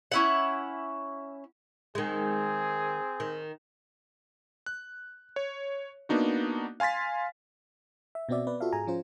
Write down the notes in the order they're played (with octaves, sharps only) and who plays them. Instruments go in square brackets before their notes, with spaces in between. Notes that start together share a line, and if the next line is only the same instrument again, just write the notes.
[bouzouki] C#4 E4 F#5
[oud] D#3 G#3 [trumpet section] C4 G#4
[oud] D#3
[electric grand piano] F#6
C#5
A#3 B3 D4 D#4 F#4
F5 G#5 C6 A6 B6
[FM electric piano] E5
B2 B3 C4 F#4 D5 E5
B3 B4 D5
F4 F#4 A4 E5 F5
G#2 G#4 G#5 A#5
F3 C#4 F4 C5